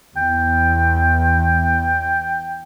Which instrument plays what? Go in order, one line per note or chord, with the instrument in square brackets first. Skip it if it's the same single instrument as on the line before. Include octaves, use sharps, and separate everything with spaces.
[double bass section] E2 [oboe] G5